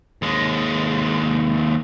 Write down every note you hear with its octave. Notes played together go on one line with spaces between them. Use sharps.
D#2 G#3